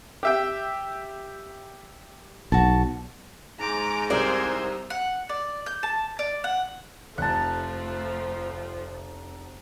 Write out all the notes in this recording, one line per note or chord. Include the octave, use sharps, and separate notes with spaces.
G4 E5 G5
B1 F#4 A5
G#2 A#5 D6
C2 C3 A#4 C5 D5 F6 G#6
F#5
D5
G6
A5
D5
F#5
F1 F3 A3 F#5 A5